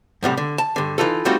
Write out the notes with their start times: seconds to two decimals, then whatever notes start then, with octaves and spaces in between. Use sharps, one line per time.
0.23 F#2 A2 C3 G3
0.37 D3
0.58 A5
0.76 G2 D3
0.98 E3 D#4 F4 A4
1.25 G3 A3 C4 D#4 F4 F#4